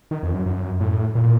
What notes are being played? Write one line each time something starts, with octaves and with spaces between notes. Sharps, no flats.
D#3
F2
F#2
F#2
A2
A#2